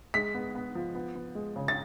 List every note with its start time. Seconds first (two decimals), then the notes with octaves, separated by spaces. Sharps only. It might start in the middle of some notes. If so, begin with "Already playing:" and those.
0.14 G#3 B6
0.34 B3
0.55 B3
0.75 F3
0.95 B3
1.15 B3
1.35 G#3
1.56 C#3
1.68 A6